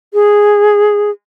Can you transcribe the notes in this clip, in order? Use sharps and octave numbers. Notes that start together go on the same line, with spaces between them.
G#4